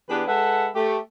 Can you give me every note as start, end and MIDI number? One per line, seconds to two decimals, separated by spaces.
0.09 0.23 52
0.09 0.23 59
0.09 0.23 62
0.09 0.23 67
0.09 0.23 68
0.09 0.23 71
0.28 0.68 56
0.28 0.68 69
0.28 0.68 71
0.28 0.68 76
0.28 0.68 78
0.75 0.98 57
0.75 0.98 67